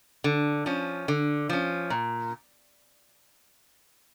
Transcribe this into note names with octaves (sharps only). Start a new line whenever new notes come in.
D3
F3 C#4
D3
F3 C#4
A#2